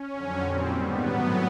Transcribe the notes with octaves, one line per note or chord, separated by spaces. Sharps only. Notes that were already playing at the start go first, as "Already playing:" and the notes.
Already playing: C#4
F2 D3 F#3
A#2 G3 C4
G#2 D#3 G3 B3
A2 F#3 B3